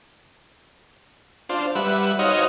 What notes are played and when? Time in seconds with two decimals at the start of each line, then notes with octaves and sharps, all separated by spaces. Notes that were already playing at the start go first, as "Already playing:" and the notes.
1.49 D4 F4 C5
1.75 G3 B4 E5 F#5
2.19 D#4 F#4 C5 C#5 D#5 F5